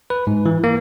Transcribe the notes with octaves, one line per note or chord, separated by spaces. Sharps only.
B4
G#2
E3
A#3